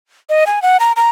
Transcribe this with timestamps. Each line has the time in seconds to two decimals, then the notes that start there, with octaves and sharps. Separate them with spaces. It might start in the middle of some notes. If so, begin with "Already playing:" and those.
0.29 D#5
0.47 G#5
0.62 F#5
0.80 A#5
0.96 A#5